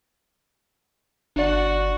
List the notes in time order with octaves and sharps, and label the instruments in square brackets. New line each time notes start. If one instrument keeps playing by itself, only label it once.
[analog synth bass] G1 [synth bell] D4 D5 [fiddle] F#4